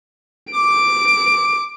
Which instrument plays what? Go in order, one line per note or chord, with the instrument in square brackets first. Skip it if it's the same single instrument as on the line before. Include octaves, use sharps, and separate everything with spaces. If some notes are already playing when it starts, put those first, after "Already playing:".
[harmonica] D6 [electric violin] D7